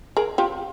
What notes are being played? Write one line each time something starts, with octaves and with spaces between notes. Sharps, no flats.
G#4 A#4
F4 G4